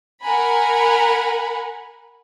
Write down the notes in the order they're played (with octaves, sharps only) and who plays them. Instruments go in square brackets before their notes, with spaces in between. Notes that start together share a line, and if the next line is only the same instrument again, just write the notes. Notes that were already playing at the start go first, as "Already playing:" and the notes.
[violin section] A#4 F#5 G#5 A#5 B5